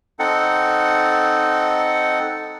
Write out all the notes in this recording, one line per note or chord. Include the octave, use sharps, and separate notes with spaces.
C4 D#4 A4 F#5